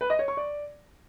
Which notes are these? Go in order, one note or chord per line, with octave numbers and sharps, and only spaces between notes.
B4
D#5
C#5
C#6
D5